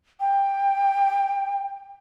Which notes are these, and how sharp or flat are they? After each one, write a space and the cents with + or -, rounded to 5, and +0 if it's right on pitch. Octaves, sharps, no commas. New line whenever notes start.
G5 +15